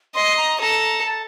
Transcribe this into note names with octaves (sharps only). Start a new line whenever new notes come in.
D#5 C6
A#5
A4 A#5
A5